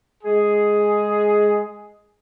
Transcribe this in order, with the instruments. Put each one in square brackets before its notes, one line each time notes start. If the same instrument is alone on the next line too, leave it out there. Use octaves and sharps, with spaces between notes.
[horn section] G#3 G#4